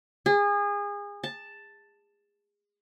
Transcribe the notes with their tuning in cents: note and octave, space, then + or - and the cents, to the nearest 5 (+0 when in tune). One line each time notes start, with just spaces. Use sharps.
G#4 -30
A5 +5